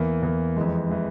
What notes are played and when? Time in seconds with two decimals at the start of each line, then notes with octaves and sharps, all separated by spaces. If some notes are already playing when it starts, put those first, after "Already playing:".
Already playing: E2 E3 A#3
0.22 E2 E3 A#3
0.56 F2 E3 G#3
0.89 E3 G#3